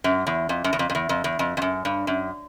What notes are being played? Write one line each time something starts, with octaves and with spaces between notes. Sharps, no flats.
F#2
E2
F2
F#2
E2
F2
F2
E2
F2
E2
F2
F2
F#2
G2
F#2